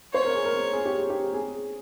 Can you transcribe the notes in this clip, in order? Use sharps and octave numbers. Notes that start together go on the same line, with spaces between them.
C5 C#5
A#4
G#4
A#4
G#4
G4
G4
G#4